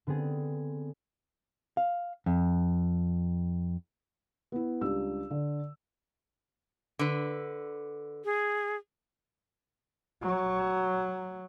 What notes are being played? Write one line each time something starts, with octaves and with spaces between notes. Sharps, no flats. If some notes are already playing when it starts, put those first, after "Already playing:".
D3 B3 C4 G#4
F5
F2
B3 E4
C#2 G3 D4 E6
D3
D3 B4
G#4
F#3